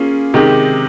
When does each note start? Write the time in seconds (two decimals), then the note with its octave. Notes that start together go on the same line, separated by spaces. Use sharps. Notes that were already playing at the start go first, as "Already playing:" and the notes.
Already playing: A#3 C#4 F4 G#4
0.34 C3 D#3 G#3 D#4 G4